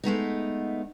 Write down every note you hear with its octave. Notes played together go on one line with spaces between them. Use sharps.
G#3 A3 B3 D#4